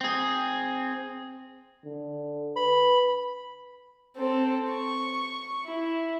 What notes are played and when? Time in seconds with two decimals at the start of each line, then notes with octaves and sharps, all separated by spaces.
0.01 C4 G#4
1.85 D3
2.56 B4 B5
4.17 C4 A4
4.72 C#6
5.66 E4